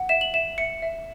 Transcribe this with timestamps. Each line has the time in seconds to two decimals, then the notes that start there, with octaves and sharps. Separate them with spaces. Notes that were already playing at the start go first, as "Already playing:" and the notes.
Already playing: F#5
0.09 E5 E7
0.21 F#7
0.34 E5 E7
0.58 E5 C#7
0.82 E5